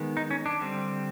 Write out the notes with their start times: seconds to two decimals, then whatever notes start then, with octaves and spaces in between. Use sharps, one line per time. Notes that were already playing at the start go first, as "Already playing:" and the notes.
Already playing: D#3 G#3 B3
0.17 D#4
0.31 C#4
0.46 D4
0.61 D3 G3 C4